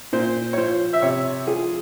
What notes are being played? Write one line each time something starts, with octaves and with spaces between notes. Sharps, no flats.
A#2 C5
C#5
F3 C5
E5
C3 C#5
F3 G#4